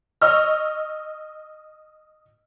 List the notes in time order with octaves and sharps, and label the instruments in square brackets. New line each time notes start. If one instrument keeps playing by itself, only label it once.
[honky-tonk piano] D#5 C#6 E6 F6